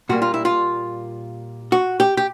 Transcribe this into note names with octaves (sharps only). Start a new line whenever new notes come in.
A#2 G3 A#3 F#4
F4
E4
F4
F#4
G4
G4